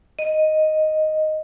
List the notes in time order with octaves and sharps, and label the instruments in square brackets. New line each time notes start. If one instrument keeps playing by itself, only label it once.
[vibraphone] D#5